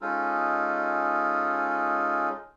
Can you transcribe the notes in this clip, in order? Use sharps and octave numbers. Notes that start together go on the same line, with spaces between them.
G#3 C#4 D#4 F4 A4